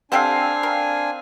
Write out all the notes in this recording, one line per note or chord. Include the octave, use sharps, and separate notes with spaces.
C4 D4 G4 A4 F5 F#5 G#5
A#4